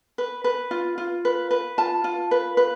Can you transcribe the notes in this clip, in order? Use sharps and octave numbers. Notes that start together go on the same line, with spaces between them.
B4
B4
F4
F4
B4
B4
F4 A5
F4
B4
B4